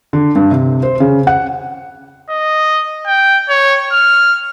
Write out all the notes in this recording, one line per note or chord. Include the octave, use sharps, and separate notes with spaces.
D3
G2
C3
C5
C#3
F#5
D#5
G5
C#5
F6